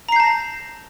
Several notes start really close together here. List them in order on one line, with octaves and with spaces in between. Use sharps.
A#5 C7 G6 A5 A#6